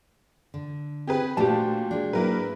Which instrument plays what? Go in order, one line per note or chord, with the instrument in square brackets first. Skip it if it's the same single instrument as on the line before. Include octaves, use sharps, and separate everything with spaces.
[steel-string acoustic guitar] D3
[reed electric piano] C4 [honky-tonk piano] G4 G#4 B4
[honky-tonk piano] A#2 [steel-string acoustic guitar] A3 D4 C5 [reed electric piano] F#4 F5 [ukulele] G4 A5
[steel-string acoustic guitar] G#3 D4
[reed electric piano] G#2 F#3 A#3 [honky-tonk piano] E4 A#4 B4